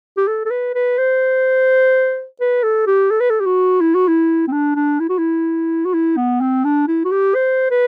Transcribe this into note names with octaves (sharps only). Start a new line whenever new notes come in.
G4
A4
A4
B4
B4
C5
B4
A4
G4
A4
B4
A4
G4
F#4
E4
F#4
E4
C4
D4
D4
E4
F#4
E4
F#4
E4
B3
C4
D4
E4
F#4
G4
C5
B4